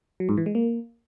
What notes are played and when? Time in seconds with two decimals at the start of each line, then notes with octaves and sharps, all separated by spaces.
0.20 F#3
0.29 G#2
0.38 E3
0.46 G#3
0.55 A#3